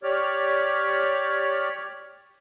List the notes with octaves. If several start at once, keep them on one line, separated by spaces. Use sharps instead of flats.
G4 C#5 D5 F6